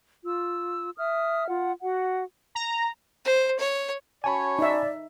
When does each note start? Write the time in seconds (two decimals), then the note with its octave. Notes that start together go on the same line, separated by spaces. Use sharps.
0.23 F4 E6
0.97 E5 D#6 F6
1.48 F4 F#5
1.82 F#4 F#5
2.55 A#5
3.25 C5
3.59 C#5
4.24 C#4 F#4 C#5 G#5 A5 B5
4.59 D#4 D5 E5